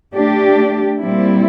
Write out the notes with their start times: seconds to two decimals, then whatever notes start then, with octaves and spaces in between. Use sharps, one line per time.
0.15 A3 D4 G4
1.00 A#2 G3 C4 E4